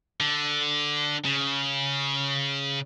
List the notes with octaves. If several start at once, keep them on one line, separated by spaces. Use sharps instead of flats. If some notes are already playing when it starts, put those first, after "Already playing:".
D3
C#3